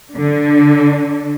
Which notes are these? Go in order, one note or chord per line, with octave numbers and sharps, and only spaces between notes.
D3